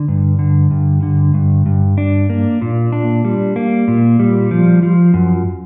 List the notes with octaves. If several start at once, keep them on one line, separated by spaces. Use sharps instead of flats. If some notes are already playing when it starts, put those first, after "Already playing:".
Already playing: D3
G2
D3
G2
D3
G2
G2
D4
A#3
A#2
D4
G3
A#3
A#2
G3
F3
F3
F#2